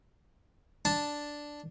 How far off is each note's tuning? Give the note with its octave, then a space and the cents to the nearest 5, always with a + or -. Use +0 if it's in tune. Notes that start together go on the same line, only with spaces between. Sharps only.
D4 +0 A5 +0